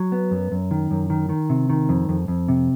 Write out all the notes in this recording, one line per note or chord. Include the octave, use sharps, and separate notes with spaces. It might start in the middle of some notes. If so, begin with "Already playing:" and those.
Already playing: F#3
B3
F#2
F#2
D#3
F#2
D#3
D#3
C3
D#3
F2
F2
F2
C3